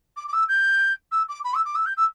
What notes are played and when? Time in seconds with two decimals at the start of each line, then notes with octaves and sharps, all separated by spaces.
0.17 D6
0.28 D6
0.33 E6
0.48 G6
1.12 E6
1.29 D6
1.44 B5
1.54 E6
1.65 D6
1.75 E6
1.86 G6
1.97 E6